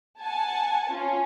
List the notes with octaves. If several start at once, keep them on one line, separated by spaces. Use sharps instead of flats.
F#5 G#5 A5
C#4 F4